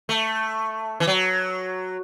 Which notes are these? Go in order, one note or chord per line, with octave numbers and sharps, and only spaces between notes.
A3
E3
F#3